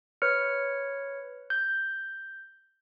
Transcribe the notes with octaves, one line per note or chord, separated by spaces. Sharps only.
B4 C#5 F6 C#7
G6